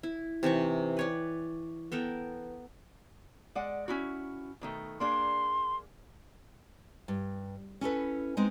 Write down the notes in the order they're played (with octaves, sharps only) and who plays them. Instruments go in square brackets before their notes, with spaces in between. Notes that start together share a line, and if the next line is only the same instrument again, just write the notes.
[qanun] E4
C3 E3 D#4 C#6
B4 C#5 D5
B3 A4 A#4 G5
[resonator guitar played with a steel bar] G#3 D5 F#5
C#4 E4 F#4
B2 D#3 A3
[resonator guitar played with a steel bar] A#3 D4 G#4 [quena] C6
[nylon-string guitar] G2
C#4 E4 A4 B4
G#3 B3 C4 D#4